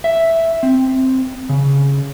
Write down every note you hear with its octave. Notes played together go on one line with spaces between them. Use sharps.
E5
C4
C#3